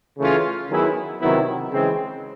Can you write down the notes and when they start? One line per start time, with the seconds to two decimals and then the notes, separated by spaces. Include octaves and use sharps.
0.18 C#3 E3 A3 C#4 F4
0.69 D#3 F#3 B3 E4 G#4
1.20 C3 D#3 F#3 B3 E4
1.72 C#3 E3 G#3 C4